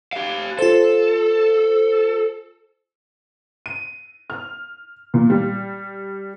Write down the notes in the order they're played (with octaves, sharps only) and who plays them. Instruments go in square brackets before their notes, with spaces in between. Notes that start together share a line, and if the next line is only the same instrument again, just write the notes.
[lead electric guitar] G4 F5
[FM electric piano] F4 C5 [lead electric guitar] A4
[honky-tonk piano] D#7
F6
A#2
G3